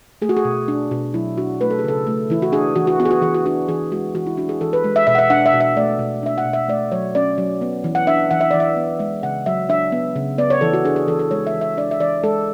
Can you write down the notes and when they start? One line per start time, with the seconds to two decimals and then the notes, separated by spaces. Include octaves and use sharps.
0.22 A3 G#4
0.29 F#4
0.37 G#4
0.45 B2
0.68 D4
0.91 B2
1.14 F#3 E4
1.38 D4 F#4
1.61 A3 B4
1.70 A4
1.79 G#4
1.84 C#3 A4
2.07 A3
2.30 E3 E4
2.42 F#4
2.52 D4 G#4
2.76 E3 F#4
2.87 F#4
3.00 B3 F#4
3.05 G#4
3.11 F#4
3.22 E3 G#4
3.34 F#4
3.46 D4 F#4
3.68 E3 G#4
3.92 G#3 F#4
4.15 E3 F#4
4.27 E4
4.37 D4 F#4
4.49 G#4
4.61 E3 A4
4.73 B4
4.84 G#3
4.96 E5
5.07 B2 E5
5.15 F#5
5.19 E5
5.30 D4 F#5
5.46 E5
5.53 B2
5.61 E5
5.77 A3 D5
5.99 B2
6.23 D4 E5
6.38 F#5
6.45 B2
6.53 E5
6.68 A3 D5
6.92 F#3 C#5
7.15 C#4 D5
7.38 F#3
7.61 B3
7.84 E3
7.95 F#5
8.07 D4 E5
8.31 E3 F#5
8.41 E5
8.51 E3 D5
8.60 E5
8.77 B3
8.99 G#3 E5
9.23 C#3 F#5
9.46 F#3 E5
9.69 D4 E5
9.92 B3
10.16 C#3
10.38 B3 D5
10.50 C#5
10.61 E3 A4
10.73 F#4
10.85 D4 G#4
10.96 G#4
11.08 E3 A4
11.19 A4
11.31 G#3 C#5
11.47 E5
11.54 E3
11.61 E5
11.77 D4 D5
11.91 E5
12.00 E3 D5
12.23 G#3 A4